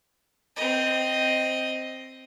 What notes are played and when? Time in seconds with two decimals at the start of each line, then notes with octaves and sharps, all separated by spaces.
0.56 C4 D#5